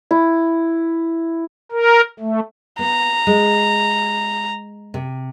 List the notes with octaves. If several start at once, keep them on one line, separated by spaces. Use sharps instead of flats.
E4
A#4
A3
B3 A#5
G#3
C3